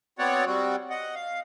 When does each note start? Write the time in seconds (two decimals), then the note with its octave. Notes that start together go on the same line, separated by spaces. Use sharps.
0.19 B3 C4 F#4 C#5 D5 F#5
0.46 G3 C4 F#4
0.90 D#5 F#5
1.15 F5